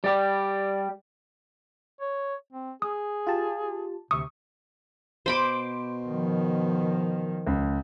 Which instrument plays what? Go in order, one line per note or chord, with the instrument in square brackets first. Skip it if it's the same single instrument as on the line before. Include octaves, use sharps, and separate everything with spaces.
[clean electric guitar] G3 G4 [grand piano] D5
[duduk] C#5
C4
[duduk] G#4 [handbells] D#6
[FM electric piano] F4 G4 A5
[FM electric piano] D2 E5 C#6 [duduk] C3 [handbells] D#6
[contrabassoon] B2 [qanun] C5 B5 D6 [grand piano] C6 D7
[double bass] D#3 F3
[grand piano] C#2